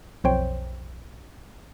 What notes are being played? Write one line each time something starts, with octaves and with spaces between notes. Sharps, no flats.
B1 F2 C5 C#5 G5